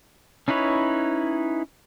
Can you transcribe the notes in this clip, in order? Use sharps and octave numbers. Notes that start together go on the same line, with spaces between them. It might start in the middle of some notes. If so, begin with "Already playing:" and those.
C#4 D#4 E4 B4 C#5